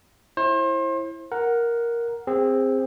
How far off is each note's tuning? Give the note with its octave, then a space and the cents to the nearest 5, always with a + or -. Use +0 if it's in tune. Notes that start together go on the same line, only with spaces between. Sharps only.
E4 +0 C5 +35
A#4 +5 F#5 +0
C4 +5 G#4 -25